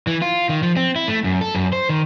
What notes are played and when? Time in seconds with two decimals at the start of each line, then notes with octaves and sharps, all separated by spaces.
0.07 E3
0.22 F4
0.49 D#3
0.63 F3
0.77 C4
0.96 E4
1.08 A3
1.24 F#2
1.41 A4
1.55 F#2
1.73 C5
1.89 D#3